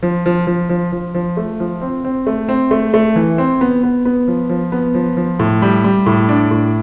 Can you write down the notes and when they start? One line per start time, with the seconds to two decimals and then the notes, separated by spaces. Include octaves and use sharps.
0.02 F3
0.26 F3
0.47 F3
0.69 F3
0.92 F3
1.14 F3
1.37 A3
1.60 F3
1.81 C4
2.04 C4
2.27 A3
2.48 C4
2.71 A3
2.94 A3
3.16 E3
3.38 C4
3.61 B3
3.83 B3
4.05 B3
4.28 F3
4.49 F3
4.72 B3
4.94 F3
5.17 F3
5.40 A2
5.62 G3
5.84 G3
6.06 A2
6.29 D4
6.51 A2